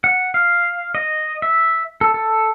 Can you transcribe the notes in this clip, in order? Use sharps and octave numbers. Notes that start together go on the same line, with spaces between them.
F#5
F5
D#5
E5
A4
A4